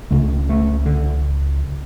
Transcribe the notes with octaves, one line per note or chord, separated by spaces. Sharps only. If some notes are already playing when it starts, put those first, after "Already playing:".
C#2 C#3 A3
A3
D3